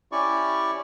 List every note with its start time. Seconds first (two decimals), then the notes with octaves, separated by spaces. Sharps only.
0.12 C#4 E4 G4 D5 C#6